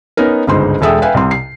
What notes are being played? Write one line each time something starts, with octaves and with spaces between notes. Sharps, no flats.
B3 C#4 D#4 A#4
G1 C#2 G#2 D#4 C5 C6
E1 G#3 A4 E5 G5 D#6
B4 E5 F5 G5 G#5
C2 C3 C6
C7